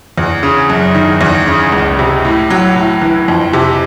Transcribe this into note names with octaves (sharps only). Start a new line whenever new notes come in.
E2
C#3
F#2
D#3
E2
C#3
C#2
C3
A2
F#3
A2
E3
F2
C3